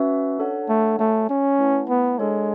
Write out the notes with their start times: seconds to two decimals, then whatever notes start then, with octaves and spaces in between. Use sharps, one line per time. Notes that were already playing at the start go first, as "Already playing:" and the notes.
Already playing: C#4 F#4 B4 E5
0.38 D4 A4 C#5 F#5
0.69 A3
0.99 A3 F#4 C#5 G#5
1.29 C#4
1.59 A3 E4 B4 F#5 A5
1.90 B3
2.19 G#3 D4 A4 C#5